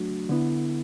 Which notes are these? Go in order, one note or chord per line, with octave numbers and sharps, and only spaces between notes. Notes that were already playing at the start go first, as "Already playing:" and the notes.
Already playing: F#3 A3 D4 F#4
D3 B3 E4